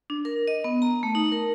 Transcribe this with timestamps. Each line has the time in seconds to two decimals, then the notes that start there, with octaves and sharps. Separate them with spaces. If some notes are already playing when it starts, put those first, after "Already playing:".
0.10 D4
0.25 A#4
0.47 D#5
0.64 B3
0.82 A#5
1.03 A3
1.15 D#4
1.32 A#4